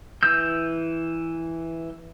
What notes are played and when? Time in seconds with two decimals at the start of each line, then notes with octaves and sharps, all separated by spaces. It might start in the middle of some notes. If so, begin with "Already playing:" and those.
0.23 E3 E6 G6